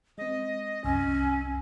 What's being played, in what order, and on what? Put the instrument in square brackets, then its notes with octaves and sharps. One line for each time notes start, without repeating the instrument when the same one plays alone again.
[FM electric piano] G#3 C4 [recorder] D#5
[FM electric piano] C2 F#2 E6 [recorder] C#4 [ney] G#5